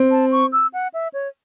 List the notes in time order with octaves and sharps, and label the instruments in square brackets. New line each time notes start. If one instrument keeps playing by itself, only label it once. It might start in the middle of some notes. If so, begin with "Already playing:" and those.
Already playing: [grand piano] C4
[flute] A5
C#6
E6
F#5
E5
C#5